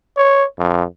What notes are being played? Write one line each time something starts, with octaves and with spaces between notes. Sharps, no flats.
C#5
F2